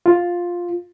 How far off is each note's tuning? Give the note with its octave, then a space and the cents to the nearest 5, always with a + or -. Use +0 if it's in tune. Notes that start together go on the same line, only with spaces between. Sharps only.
F4 +5